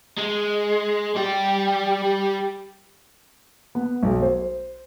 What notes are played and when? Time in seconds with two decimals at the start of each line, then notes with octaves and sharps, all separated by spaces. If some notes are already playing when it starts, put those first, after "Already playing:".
0.18 G#3
1.17 G3 G4
3.75 B3
4.03 B1
4.22 C5